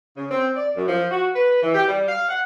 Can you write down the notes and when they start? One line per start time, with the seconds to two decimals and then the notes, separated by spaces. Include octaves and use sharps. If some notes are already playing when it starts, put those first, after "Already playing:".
0.17 C#3
0.31 C4
0.56 D5
0.76 F#2
0.88 F3
1.11 F#4
1.35 B4
1.62 E3
1.74 G4
1.89 G3
2.08 F5
2.29 F#5